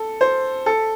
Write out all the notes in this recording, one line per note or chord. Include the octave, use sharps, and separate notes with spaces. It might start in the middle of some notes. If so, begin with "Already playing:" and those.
Already playing: A4
C5
A4